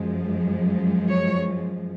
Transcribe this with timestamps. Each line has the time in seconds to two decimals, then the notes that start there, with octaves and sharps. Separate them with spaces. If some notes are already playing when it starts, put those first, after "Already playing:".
Already playing: F#2 F3 G#3
1.09 C#5